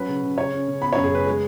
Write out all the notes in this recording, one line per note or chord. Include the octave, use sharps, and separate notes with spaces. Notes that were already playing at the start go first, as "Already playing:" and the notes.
Already playing: F#3 C#4 B4
C#3
C#3
C#3 C#5
C#4
C#3
B3 B5
C#5
F#2
G#4
C#3 B4
G#3 G#4